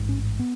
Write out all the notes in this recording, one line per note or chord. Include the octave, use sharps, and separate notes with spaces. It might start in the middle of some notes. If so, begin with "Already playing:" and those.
Already playing: A1 G#2
C#4
B3